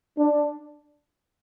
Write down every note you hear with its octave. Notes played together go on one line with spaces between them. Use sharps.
D4